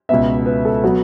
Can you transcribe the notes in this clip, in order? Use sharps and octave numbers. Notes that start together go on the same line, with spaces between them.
C#2 B2 B3 E5
B4
A4
F#3 B3 F#4